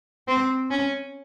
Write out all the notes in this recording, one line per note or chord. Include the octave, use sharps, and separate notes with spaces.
C4
C#4